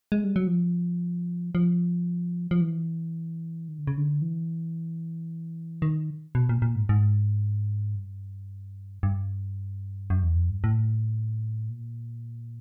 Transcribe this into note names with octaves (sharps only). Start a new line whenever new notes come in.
G#3
G3
F#3
F3
F3
F3
E3
D#3
D3
C#3
D3
E3
D#3
B2
A#2
A#2
G#2
G#2
G2
G2
F#2
E2
F2
G2
A2
A#2